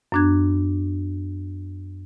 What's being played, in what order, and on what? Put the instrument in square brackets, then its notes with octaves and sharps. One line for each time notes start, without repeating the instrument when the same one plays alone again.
[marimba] F#2 B3 D4 F#6 G#6